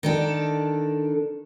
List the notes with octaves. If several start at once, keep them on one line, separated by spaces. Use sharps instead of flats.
D#3 D4 A4